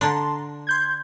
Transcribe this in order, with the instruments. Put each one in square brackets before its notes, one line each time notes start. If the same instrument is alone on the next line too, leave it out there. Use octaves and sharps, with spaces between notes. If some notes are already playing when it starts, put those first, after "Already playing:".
[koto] D3 D4 [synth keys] A5 A#5 C6
[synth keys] C6 G6 G#6